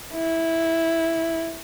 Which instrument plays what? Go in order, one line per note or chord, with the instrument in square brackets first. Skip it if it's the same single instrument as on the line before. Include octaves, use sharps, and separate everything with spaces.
[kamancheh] E4